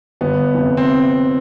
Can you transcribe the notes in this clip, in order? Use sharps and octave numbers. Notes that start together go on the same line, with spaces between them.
G1 B3
F2 C3
C4